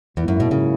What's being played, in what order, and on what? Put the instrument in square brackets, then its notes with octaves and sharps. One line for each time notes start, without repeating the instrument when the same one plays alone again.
[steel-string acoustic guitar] E2 [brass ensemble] G#2 F#3 A#3 E4
[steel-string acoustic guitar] F#2
B2
C#3